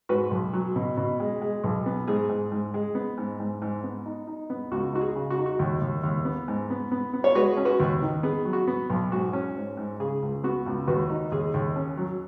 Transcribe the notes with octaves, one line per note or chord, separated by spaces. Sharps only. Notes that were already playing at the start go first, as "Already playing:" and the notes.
G#2 F#4 B4
B1
F#3
B2
B2
G#3
G#3
B1
B3
G#2 G#4
G#2
G#2
G#3
B3
G#2
G#2
G#2
B3
D#4
D#4
B3
C#2 F#4
D#4 F#4
G#4
C#3
F#4
D#4
F#4
D#2
D#2
D#2
B3
G#2
B3
B3
B3
C#5
G#3 F#4 B4
C#4
F#4 B4
D#2
D#3
B3 G#4
F#3
F#4
B3
B1
G#2 F#4
C#4
G#2
G#2
C#3 G#4
C#2
B3 F#4
C#2
D#2 F#4 B4
D#4
D#2 G#4
D#2
C#4
F#3